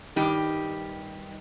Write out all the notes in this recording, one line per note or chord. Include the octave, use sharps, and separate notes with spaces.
G2 D#3 G3 D#4 G4